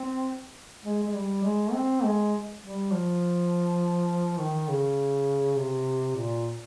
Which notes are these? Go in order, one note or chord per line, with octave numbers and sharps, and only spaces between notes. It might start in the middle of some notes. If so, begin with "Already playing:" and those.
Already playing: C4
G#3
G#3
G3
G#3
C4
G#3
G3
F3
D#3
C#3
C3
A#2